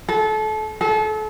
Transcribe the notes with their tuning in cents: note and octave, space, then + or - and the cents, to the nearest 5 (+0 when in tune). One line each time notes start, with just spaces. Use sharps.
A4 -30
A4 -35